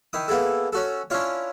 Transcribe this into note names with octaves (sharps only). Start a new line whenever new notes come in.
D#3 E4 D#6
A#3 B3 E4 G#4 A4
C#4 F#4 A4
C#4 D4 E4 F4 C#5